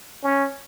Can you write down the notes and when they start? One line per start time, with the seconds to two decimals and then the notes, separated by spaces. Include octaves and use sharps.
0.23 C#4